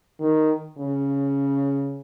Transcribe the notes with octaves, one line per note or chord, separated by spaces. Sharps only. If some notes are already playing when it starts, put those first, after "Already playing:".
D#3
C#3